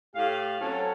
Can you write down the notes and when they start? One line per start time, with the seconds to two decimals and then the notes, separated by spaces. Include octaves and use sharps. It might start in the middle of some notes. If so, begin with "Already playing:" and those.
0.15 A2 G4 F5
0.60 F#3 C4 C#4 A4